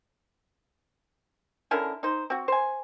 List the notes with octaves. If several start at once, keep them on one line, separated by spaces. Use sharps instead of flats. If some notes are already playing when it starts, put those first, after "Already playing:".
D3 C#4 E4 A#4
D#4 C5
C4 F#4
C5 G#5